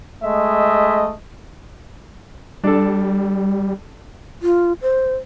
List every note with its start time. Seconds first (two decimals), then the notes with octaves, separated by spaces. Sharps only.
0.24 G#3 A3 D#5 E5
2.64 G3 D4 A4
4.42 F4
4.82 C5